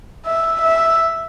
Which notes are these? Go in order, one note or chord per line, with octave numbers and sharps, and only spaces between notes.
E5
E5